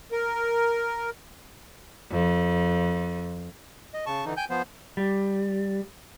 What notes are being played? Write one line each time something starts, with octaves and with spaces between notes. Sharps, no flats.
A#4
F2
D#5
C#3 A5 C#6
D3 E3 D#4
G5 G#5 G6
F3 B3 C5
G3